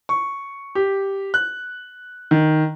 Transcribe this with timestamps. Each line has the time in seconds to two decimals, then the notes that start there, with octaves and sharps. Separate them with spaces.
0.09 C#6
0.75 G4
1.34 F#6
2.31 D#3